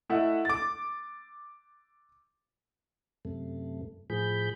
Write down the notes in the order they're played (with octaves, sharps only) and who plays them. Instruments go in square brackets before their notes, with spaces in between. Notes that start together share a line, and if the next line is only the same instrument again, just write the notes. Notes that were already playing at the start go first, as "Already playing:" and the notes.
[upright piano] A3 E4 A4 D#5 E5 F#5
D6 A6
[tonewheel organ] F#2 C3 A3
A2 F3 G#4 B5 G6